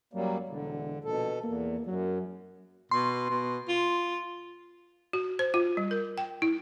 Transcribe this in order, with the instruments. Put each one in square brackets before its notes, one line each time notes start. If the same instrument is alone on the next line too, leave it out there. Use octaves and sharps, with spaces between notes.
[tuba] F#2 [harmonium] F#3 G3 A#3
[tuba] E1 [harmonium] D3
[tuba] A#1 [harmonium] B2 A4
[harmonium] E2 [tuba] A#3
[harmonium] F#2 [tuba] F#3
[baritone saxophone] B2 [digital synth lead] C6
[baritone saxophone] B2
F4
[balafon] F#4
C5
F4
G3
A#4
G5
E4